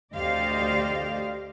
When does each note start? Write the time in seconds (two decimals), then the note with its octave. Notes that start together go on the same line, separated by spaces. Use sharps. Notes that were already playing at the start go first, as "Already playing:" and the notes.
0.13 D2 G4 C5 D5 D#5 F5